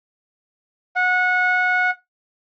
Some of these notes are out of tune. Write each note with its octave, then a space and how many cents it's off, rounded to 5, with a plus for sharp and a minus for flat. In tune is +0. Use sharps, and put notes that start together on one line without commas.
F#5 -20